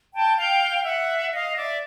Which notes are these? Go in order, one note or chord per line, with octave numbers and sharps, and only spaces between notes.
G5 A5
F5 G5
E5 F#5
D#5 F5
D5 E5